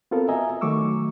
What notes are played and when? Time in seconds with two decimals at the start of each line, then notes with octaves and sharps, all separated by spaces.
0.11 B3 C4 F4 F#4 A4 A#4
0.29 D#5 E5 G#5 A#5
0.61 D#3 F#3 A3 C#6 D6 E6